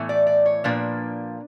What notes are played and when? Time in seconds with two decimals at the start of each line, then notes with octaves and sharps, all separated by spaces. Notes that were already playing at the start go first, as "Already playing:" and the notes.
Already playing: A2 E3 A3
0.09 D5
0.27 D5
0.46 C#5
0.64 A#2 F3 A#3 D4 B4